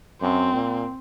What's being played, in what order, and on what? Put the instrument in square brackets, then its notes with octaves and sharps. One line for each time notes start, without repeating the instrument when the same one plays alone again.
[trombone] F#2 [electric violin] C4
[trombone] A#2